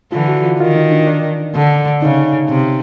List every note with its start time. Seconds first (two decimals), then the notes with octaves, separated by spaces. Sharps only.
0.12 D3 E3 F4
0.28 F#4
0.44 F4
0.60 D#3 F4
0.75 D#4
0.92 D4
1.07 D4
1.55 D3
2.02 C#3 D#4
2.49 C3